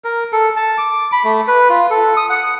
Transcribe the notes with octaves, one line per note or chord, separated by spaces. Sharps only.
A#4
A4
A5
D6
B5
A3
B4
F4
A4
D#6
F#5